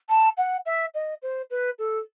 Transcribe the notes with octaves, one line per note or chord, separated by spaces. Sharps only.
A5
F#5
E5
D#5
C5
B4
A4